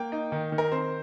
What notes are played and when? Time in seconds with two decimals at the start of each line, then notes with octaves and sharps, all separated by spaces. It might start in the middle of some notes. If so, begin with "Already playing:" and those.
Already playing: A#3 G5
0.12 D#4
0.32 D#3
0.52 D#3
0.58 A#4
0.72 C4 C5